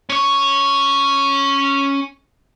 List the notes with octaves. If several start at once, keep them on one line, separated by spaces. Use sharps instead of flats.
C#4 C#5